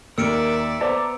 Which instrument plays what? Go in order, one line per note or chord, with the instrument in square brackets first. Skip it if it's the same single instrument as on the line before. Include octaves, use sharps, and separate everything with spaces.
[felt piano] D#2 [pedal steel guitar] A#4 [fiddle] D5 E5 [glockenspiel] E6 C#7 D7
[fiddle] B3 [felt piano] C5 D5 [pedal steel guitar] A5 A#5 D6